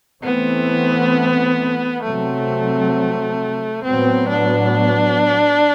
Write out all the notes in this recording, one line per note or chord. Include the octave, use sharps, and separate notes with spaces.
E3 A3 B3 C4
C3 F#3 A3 C4
A2 F#3 B3 C4
D4